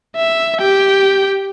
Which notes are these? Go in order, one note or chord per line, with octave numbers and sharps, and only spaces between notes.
E5
G4 G5